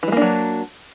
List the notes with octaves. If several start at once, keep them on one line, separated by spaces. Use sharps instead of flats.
E3 F#3 G#3 A#3 D4